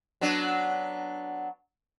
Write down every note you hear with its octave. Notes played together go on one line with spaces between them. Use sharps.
F#3 B3 D4